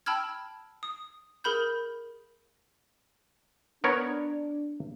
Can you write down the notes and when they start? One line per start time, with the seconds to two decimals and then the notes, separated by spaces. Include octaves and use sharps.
0.06 G5 A5 B5 E6 F6 G#6
0.83 D#6
1.44 G#4 A#4 B5 G6
3.84 B3 D4 A#4 C#5